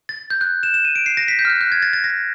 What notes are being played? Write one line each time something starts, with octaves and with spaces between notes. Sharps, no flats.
A6
G6
F#6
E7
E7
D#7
D7
C7
A#6
B6
G6
F6
F#6
F#6
G#6
A6
A6
A#6